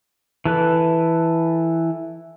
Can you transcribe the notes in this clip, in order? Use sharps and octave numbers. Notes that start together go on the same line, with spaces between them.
E3 A4 B4